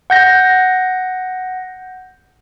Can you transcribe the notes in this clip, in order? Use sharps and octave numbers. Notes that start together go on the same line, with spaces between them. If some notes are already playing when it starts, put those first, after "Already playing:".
F#5 G6 A#6